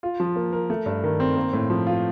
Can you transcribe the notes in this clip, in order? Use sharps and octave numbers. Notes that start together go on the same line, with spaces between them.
F4
F3
A#3
A#4
A3
G2
D#3
C4
A#3
A2
F3
F4